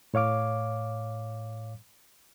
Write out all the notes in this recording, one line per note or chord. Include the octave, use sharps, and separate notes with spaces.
A2 C#5 F5 D6